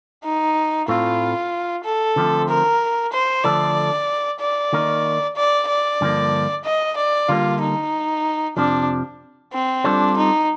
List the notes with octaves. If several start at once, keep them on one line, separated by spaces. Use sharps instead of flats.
D#4
A2 A3 C4 F4
A4
D3 F3 A3 C4
A#4
C5
D3 F3 A3 D4 A4 D5
D5
D#3 A#3 D#4 A#4
D5
D5
G2 D3 F3 A#3
D#5
D5
D3 G3 A#3 F4
D#4
F2 C3 F3 D4
C4
G3 C4 D4 F4 A4 C5
D#4